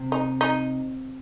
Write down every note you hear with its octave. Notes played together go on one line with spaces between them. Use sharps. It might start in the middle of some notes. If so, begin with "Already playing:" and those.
Already playing: C3
D#4
D#4